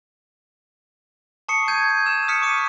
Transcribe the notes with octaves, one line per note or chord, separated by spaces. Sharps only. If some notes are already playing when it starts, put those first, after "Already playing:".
A5 C#6 D#6 C7 C#7
G6 G#6 D#7
E6 E7
D#6 F6 B6 C#7
C#6 D6 C#7 D#7